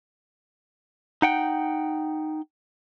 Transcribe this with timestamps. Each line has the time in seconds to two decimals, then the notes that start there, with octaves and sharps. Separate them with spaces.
1.22 D#4 F#5 G5